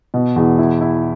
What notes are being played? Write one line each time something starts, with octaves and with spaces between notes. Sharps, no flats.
B2
E2
E4
E4